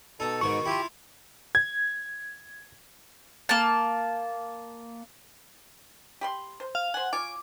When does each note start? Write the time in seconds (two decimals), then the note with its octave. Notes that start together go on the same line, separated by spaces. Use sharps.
0.20 B2 D#4 A4
0.41 G#2 B2 D#3 F#4 C#6
0.65 E4 F4 G4
1.55 G#6
3.49 A#3 A5
6.21 G4 B5 C6
6.60 C5
6.75 F5
6.94 C5 F#5 G#5
7.13 F4 C#5 G#5 D6